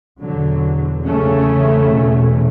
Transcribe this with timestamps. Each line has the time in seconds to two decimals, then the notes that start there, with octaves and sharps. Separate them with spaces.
0.21 E2 B2 D3 F#3
1.07 E2 C#3 A3 C#4
1.92 E2 B2